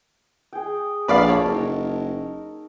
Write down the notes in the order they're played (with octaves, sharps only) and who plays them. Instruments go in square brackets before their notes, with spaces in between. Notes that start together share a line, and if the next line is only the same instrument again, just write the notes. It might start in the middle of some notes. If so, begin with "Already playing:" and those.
[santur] G#4 G5
[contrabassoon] A#1 [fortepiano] B4 D5 F5
[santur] A4 [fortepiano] C#5
[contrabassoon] F#1 [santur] D#4 A#4